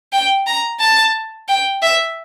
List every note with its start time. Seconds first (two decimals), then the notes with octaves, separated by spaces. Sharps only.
0.13 G5
0.47 A#5
0.80 A5
1.49 G5
1.82 E5